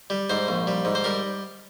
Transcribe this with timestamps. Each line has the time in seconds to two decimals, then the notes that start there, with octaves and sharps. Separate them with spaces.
0.10 G3
0.30 G#2 C5
0.48 A#1
0.67 G3
0.85 G#2
0.95 C5
1.04 G3 A#4